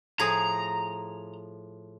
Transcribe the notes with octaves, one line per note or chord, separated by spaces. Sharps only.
A2 F3 G#4 A#5